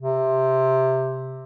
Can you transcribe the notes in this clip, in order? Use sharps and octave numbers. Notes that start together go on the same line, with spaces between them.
C3